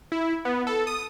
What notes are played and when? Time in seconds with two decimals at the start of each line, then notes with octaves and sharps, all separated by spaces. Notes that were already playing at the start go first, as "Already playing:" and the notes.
0.12 E4
0.45 B3
0.67 A4
0.87 D#6